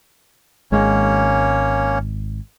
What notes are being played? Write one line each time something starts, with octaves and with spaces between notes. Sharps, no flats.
G#1 G#3 A#3 C#4 C#5